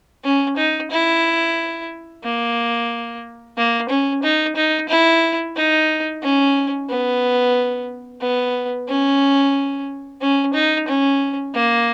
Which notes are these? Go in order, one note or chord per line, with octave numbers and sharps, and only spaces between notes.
C#4
D#4
E4
A#3
A#3
C#4
D#4
D#4
E4
D#4
C#4
B3
B3
C#4
C#4
D#4
C#4
A#3